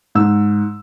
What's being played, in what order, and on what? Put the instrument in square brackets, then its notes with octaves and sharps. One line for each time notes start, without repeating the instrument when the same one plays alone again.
[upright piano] G#2 E6